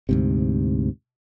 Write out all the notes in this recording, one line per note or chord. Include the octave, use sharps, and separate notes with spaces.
D2 G#2 C3